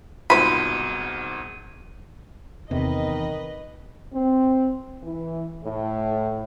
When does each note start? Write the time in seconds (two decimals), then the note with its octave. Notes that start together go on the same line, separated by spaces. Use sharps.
0.30 C2 G#2 B2 F4 C5 B5 D#7
2.71 E2 C3 D#3 B4 D#5
4.12 C4
5.03 E3
5.63 A2